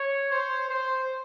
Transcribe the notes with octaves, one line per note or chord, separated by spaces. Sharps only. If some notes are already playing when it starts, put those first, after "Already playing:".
Already playing: C#5
C5
C5